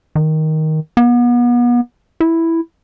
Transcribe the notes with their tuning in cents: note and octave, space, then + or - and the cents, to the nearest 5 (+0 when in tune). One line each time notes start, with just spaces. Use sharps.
D#3 +10
B3 -35
E4 +0